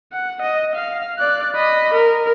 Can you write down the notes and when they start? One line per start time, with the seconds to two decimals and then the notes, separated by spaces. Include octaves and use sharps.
0.12 F#5
0.42 D#5
0.75 F5
1.18 D5 F#6
1.55 D#5 B5
1.94 A#4